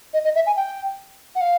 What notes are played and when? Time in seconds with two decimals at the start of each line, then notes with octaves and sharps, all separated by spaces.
0.14 D#5
0.24 D#5
0.35 E5
0.46 G#5
0.56 G5
1.35 F#5
1.41 F5